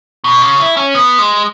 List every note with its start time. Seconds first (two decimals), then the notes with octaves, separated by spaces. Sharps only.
0.24 B2
0.42 C#3
0.60 E4
0.77 C#4
0.95 B3
1.19 G#3